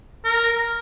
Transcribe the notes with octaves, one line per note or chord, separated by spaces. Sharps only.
A#4